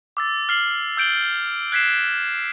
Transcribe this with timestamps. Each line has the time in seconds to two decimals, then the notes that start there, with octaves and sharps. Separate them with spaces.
0.17 D6 E6 A6
0.49 F6 C7 F#7
0.97 E6 G6 D7 F#7 G7
1.72 F#6 G#6 B6 C7 E7